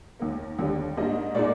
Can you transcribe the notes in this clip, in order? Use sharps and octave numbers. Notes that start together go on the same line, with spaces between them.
D#2 D#3 A#3
D#2 D3 G3 D4
G#2 G3 A#3 D4 D#5
A#2 G#3 D#4 D5